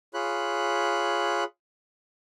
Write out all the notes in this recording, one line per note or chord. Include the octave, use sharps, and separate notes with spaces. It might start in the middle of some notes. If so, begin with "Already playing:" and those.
F4 G#4 C#5 B5 F#6